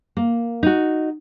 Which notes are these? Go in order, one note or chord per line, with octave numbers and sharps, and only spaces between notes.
A#3
D#4 F#4